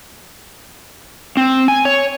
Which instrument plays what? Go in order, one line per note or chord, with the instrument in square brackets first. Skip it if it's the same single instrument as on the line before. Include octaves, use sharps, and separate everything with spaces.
[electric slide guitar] C4
G#5
C#5